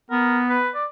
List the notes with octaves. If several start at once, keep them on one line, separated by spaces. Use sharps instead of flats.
B3 A#4
B4
D5